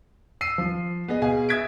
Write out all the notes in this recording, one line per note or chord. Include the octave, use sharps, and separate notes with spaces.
E6 C7 D#7
F3
B3 G#4 D#5
B2 G#4 F5 G#5
E5 D#6 G#6 B6 D7